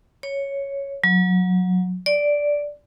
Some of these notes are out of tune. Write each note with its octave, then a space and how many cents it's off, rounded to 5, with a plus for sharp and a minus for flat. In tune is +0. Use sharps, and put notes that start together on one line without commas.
C#5 +0
F#3 -20
D5 -5